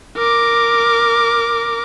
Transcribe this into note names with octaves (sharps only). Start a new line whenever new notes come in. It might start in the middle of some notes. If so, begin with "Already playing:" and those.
A#4 D6